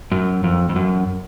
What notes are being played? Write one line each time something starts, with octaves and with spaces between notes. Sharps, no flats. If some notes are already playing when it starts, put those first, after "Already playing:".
F#2
F2
F2
F#2